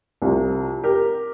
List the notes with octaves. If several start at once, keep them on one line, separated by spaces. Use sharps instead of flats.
C2 C3 F3
G4 A#4